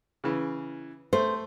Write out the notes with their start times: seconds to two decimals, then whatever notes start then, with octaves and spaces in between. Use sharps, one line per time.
0.24 C#3 E3
1.13 A3 C5